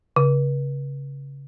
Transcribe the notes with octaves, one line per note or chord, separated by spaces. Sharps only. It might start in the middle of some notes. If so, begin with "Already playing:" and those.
C#3